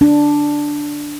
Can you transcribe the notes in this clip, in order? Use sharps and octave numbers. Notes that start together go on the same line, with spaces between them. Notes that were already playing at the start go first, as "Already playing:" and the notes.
D4